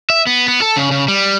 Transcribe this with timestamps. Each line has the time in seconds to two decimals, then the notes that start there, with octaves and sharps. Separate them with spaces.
0.10 E5
0.27 B3
0.48 B3
0.62 A4
0.77 C#3
0.91 C#3
1.08 G3